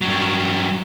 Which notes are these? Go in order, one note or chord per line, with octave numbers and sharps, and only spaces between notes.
G2 F#3